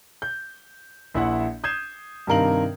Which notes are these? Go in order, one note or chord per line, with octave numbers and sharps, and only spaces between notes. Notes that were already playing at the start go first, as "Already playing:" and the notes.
G6
A#1 E4 E5 F#5
D#6 G6 G#6 C7 E7
G2 C3 D#3 A#4 F5 F#7